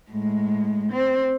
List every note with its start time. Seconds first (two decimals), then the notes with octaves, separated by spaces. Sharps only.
0.11 A2 G#3
0.92 C4